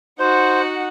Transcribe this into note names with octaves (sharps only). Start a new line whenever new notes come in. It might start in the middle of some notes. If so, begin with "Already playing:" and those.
D#4 F#4 C5 F#5